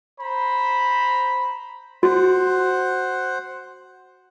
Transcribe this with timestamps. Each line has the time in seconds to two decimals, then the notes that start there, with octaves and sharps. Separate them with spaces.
0.20 C5 A#5 B5
2.03 F#4 C5 F#5